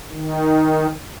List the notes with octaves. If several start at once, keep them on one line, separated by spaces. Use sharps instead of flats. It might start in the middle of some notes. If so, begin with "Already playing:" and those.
D#3